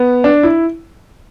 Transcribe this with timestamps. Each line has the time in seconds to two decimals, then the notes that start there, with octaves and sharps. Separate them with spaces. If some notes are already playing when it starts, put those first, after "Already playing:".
Already playing: B3
0.24 D4
0.43 E4